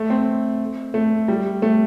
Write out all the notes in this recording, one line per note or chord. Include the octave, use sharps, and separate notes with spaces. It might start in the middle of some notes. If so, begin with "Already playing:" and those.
Already playing: A3
C4
A3
G3
A3